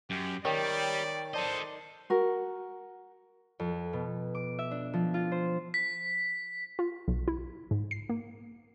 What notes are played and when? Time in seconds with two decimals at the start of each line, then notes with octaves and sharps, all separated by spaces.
0.10 F#2 G4
0.45 D#3 G3 C#5 D5 G5
1.34 A4 C5 D5 D#5 A5 D#7
2.10 F#4 A#4
3.59 F2
3.93 B2
4.35 D6
4.59 E5
4.71 D4
4.93 F3
5.14 F4
5.32 C5
5.74 B6
6.79 F4
7.08 B1
7.28 E4
7.71 G#2
7.91 C7
8.09 A#3